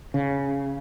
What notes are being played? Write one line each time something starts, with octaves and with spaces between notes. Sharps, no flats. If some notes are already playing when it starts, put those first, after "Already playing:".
C#3